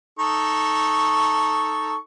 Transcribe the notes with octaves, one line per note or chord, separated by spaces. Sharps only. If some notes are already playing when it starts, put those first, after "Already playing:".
D#4 A4 C#6